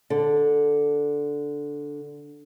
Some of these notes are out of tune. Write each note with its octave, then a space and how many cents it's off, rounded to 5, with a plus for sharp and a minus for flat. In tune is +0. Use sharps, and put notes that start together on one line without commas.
D3 -5